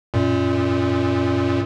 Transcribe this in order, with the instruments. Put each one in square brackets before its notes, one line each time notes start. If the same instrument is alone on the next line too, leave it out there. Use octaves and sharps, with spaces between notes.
[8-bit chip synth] F#2 A#2